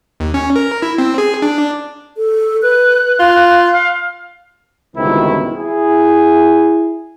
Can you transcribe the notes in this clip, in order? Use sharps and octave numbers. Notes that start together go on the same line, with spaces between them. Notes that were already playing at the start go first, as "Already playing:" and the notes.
D#2
C#4
A#4
E4
C4
G#4
D4
A4
B4 F#6
F4 F5
F5
G1 C#2 B2 D#3 C4 E4
E4 G#4